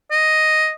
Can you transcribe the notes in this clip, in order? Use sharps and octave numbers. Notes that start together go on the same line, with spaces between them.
D#5